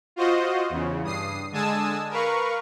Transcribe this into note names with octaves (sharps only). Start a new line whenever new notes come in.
F4 F#4 C5 D#5
E2 C#3
G2 D#6 C7
D3 G#3 G#5 A5 D#6 E6
A#4 B4 F5 C#6